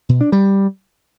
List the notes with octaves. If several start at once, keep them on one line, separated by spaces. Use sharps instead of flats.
B2
D4
G3